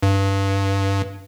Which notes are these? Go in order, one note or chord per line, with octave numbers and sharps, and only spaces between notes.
G2